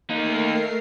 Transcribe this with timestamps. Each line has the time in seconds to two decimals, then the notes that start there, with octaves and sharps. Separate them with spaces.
0.10 A3 A#3 D#4 A#4 C7